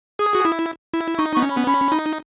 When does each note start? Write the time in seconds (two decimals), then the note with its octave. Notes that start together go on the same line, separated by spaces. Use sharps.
0.19 G#4 D#6
0.35 F#4
0.45 E4
0.94 E4
1.18 D#4 C#6
1.35 B3 C#6
1.42 C#4
1.51 B5
1.57 B3
1.67 C#4 B5
1.92 D#4